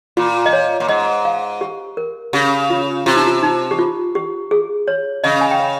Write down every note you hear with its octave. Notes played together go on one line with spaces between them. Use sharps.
A#2 F4
D#5
C#5
A#2
G#2 D#5
F5
G4
A#4
C#3 G4
F4
C3 F4
D#4
F4
D#4
G4
F4
G4
G#4
C#5
C#3 D#5
G#5
G5
F5